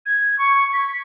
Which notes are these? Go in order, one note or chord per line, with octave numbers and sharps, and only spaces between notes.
G#6
C#6
B6